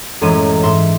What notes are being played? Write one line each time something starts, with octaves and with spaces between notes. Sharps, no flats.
A1 F#2 G#3 E4 D#7
G#2 E5 C6